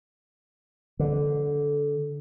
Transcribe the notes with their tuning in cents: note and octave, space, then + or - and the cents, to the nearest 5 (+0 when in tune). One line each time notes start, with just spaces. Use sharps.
D3 -15